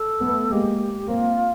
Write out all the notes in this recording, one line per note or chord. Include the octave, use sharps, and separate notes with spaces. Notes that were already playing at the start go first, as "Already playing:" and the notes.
Already playing: A4
A3 B3
G#3 A#3 G4
A#3 C4 F4